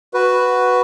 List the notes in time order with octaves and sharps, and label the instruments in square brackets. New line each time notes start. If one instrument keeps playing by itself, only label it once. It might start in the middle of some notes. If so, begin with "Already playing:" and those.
[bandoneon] F#4 B4